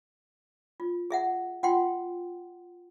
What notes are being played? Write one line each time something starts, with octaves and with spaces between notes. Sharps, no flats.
F4
G#4 E5 F#5
F4 F#5 G5 C6